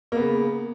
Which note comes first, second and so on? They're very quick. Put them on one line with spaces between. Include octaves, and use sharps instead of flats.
A#3 B3 C#3